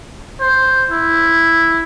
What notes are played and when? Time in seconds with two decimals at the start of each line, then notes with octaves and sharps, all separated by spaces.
0.40 C5
0.90 E4